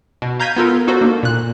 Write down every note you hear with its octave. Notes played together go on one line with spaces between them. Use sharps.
B2
F5 A#5 G6 G#6 B6 D#7
B3 F4 A4 A#4
D#4 F#4 A4 C5
A#3 D4
A#2 F#6